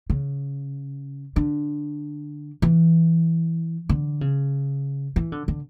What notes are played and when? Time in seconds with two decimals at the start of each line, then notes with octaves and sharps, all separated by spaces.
0.10 C#3
1.36 D3
2.62 E3
3.89 D3
4.21 C#3
5.16 E3
5.32 D3
5.48 D3